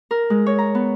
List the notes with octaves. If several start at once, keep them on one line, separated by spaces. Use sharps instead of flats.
A#4
G#3
C#5
A#5
B3